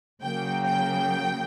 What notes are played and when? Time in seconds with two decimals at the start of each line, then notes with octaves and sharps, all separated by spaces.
0.22 C#3 F#3 A#3 G5
0.66 G5